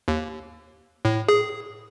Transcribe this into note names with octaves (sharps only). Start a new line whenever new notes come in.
D#2
A2
G#4